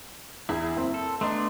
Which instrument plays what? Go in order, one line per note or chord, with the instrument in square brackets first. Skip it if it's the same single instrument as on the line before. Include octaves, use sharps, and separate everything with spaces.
[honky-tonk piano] E2 G#4 [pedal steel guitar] E4
[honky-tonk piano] F#1 C4
[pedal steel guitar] A4
[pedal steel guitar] A3 B3 D4 [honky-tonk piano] D#5 A#5 C6